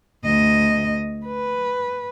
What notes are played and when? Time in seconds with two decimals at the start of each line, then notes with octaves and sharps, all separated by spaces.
0.25 D2 D#5
1.26 B4